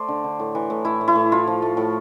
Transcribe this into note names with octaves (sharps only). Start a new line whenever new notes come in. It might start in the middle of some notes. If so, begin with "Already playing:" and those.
Already playing: A3 C5 D5
D3
D3
A2
E3
A2
A2 E4
A2
E4
A2
A3 F4
F3
A3
A2